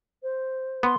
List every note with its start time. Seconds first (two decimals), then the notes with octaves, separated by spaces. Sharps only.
0.22 C5
0.83 B3 C6